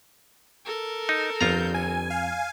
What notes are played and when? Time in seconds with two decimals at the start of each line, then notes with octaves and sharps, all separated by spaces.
0.65 A4 A#4
1.09 D#4
1.41 G1 F2 F4 A#5 G6
1.74 G#5
2.10 F5 G#5